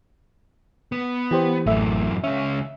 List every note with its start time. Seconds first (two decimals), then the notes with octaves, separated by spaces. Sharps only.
0.92 B3
1.31 E3 G4 C5
1.66 A1 F#2 E3 A3 E5
2.24 C#2 C#4 E5